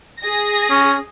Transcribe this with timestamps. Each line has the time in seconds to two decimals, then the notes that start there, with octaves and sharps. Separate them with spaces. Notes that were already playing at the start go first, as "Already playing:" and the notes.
0.20 G#4 A#6
0.71 C#4